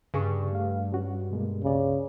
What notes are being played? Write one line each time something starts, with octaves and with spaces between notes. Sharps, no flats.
G2 C#3 G#4 C#6
A3 F5
G3 C#4 F#4
B2 G#3 A#3
C#2 C#3 D5